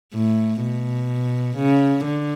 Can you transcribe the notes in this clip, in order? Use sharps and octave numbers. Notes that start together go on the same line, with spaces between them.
A2
B2
C#3
D3